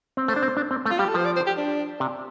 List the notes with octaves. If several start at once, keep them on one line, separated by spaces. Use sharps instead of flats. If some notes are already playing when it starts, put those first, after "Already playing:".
C4
A3 C5
D4
C4
D4
C4
A3
F4
G3 G4
A4
F3 C5
D5
C5
G4
D4
C3